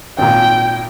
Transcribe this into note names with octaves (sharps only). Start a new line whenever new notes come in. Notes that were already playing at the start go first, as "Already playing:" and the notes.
G#1 A#2 G5